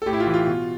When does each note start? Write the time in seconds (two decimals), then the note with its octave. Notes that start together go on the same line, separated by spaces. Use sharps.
0.02 A4
0.06 A2 G4
0.13 E4
0.20 F4
0.27 E3
0.34 F4
0.47 B2